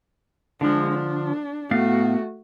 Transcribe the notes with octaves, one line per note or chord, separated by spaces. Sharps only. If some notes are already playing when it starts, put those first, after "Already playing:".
D3 F3 G#3 D4
D4
A2 A3 B3 F#4 F5